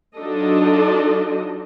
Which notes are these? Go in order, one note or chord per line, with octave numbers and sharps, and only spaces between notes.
F#3 D4 D#4 F4 A4 D#5